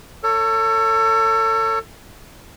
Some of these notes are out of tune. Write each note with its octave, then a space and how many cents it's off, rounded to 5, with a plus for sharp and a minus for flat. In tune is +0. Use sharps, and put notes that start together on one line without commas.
A4 +30 C#5 +0